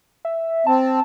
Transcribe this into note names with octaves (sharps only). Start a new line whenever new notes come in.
E5
C4 A5